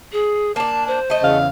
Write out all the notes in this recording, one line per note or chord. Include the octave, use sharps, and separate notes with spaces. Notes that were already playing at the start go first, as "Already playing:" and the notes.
G#4
A#3 D4 A5
C5
A3 D#5
E2 C#3 F5